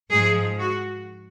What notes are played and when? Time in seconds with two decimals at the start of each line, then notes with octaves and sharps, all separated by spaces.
0.10 G#2 F3 G#4
0.58 F#4